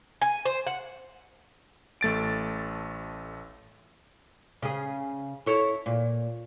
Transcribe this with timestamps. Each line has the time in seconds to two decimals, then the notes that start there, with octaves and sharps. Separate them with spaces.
0.22 G#5
0.45 C5
0.67 F#5
2.01 A1 A3 A6 D7
4.62 C#3 G#4
5.46 E4 A4 C#5
5.86 A#2